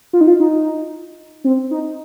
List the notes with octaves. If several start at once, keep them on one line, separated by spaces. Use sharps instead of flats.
F4
D#4
F4
D#4
C4
D#4